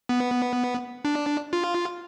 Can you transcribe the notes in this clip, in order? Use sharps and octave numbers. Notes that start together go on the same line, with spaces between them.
B3
D4
F4